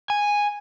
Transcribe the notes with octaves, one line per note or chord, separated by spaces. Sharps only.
G#5